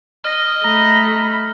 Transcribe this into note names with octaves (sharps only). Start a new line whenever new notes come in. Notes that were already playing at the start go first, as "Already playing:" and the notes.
D#5 F6 A#6
A3 A#5 B5